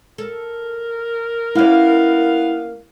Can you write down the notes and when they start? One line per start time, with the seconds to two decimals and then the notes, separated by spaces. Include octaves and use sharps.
0.18 A4 A#4
1.55 A#3 B3 C#4 E4 F5